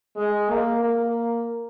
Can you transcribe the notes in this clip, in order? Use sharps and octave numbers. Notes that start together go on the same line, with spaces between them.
G#3
A#3
A#3